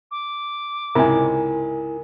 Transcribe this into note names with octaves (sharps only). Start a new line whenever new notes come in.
D6
C#2 G#2 C3 E4 A#4 G#5